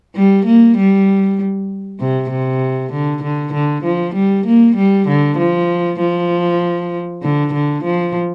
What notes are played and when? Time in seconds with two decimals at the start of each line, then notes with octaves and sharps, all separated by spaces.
0.16 G3
0.46 A#3
0.77 G3
1.99 C3
2.31 C3
2.92 D3
3.23 D3
3.53 D3
3.84 F3
4.15 G3
4.46 A#3
4.76 G3
5.08 D3
5.38 F3
6.00 F3
7.22 D3
7.53 D3
7.84 F3